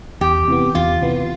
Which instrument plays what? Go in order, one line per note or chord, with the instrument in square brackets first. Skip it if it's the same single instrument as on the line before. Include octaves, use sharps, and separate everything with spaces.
[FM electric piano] E2 [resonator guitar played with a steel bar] G4
[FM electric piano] C3 E3 B3
[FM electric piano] E2 [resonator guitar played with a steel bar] F4
[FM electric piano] C3 E3 B3